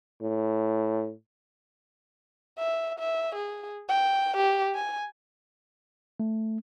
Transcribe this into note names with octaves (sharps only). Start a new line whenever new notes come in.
A2
E5
E5
G#4
G5
G4
G#5
A3